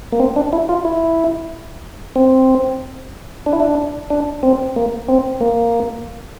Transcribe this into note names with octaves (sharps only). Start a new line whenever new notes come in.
A#3
C4
D4
E4
F4
E4
C4
D4
E4
D4
D4
C4
A#3
C4
A#3